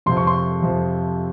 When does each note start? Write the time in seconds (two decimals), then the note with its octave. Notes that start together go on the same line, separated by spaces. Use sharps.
0.06 F2 C3 F3 C6
0.17 C#6
0.27 C6
0.62 F2 C3 F3